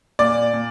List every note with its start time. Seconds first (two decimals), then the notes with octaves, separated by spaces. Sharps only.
0.19 A#2 D5
0.53 A#2